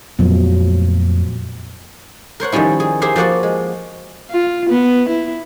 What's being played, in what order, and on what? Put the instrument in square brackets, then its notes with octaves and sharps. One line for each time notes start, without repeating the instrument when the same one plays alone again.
[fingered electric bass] F2 A#2 A3 [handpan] F3 F#3 B3
[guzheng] A#4 C5 C#5 F#5
D#3 F3 G3 C#4 E4
G#4
G4 G#4 A#4 C5 E5 F5
F3 A#3 F#4 D5 F#5
G#3
[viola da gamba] F4
B3
E4